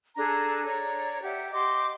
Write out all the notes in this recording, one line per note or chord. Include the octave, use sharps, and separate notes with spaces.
D4 G#4 A4 A#5
C#5 D5 A#5
G4 E5 F#5
G4 D#5 C6 D6